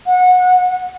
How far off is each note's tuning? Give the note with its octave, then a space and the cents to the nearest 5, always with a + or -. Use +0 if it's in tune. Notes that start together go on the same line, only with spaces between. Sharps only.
F#5 -20